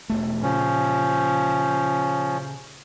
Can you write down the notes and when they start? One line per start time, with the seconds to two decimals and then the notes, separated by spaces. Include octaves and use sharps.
0.10 E1 D#2 A3
0.42 A#2 C#3 F3 C#4